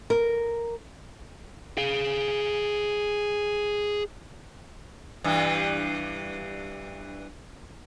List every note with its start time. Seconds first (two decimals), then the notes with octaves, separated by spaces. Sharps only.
0.10 A#4
1.78 G#4 F5
5.24 G2 E3